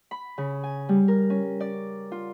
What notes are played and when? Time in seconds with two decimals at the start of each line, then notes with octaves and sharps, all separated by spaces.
0.11 B5
0.38 C#3
0.63 G#5
0.89 G3
1.08 A#4
1.30 C#4
1.60 D5
2.12 F4